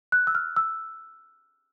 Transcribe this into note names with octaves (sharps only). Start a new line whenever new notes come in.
F#6
E6
F6
E6